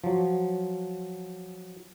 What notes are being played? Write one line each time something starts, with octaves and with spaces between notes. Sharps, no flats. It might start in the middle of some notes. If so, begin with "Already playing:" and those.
F3 F#3